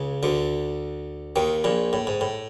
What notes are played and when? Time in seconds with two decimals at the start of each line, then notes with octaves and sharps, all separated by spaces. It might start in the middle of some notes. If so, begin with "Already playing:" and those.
Already playing: C#2 C#3
0.23 D2 D3
1.36 D#2 D#3
1.64 A#1 A#2
1.93 A2
2.07 G#2
2.21 A2